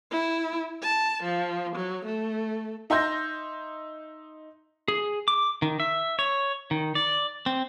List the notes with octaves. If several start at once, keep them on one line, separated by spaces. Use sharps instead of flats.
E4
A5
F3
F#3
A3
D#4 E5 C6 G6 A#6
G#4
D6
D#3
E5
C#5
D#3
D5
C4